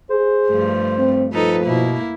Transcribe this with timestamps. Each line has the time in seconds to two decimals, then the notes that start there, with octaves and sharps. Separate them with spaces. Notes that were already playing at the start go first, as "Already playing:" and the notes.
0.10 G#4 C5
0.48 G2 F3 A3
0.98 C4
1.33 F3 D#4 A4 B4
1.65 B2 A#3 E4